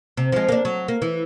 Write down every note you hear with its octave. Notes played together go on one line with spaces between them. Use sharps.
C3
F3 G#3
A#3 D4
F#3
A#3
E3